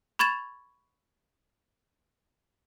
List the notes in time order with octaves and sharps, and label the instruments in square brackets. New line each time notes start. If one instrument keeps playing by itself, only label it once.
[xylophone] B5 C#6 G#6 A6 E7 F7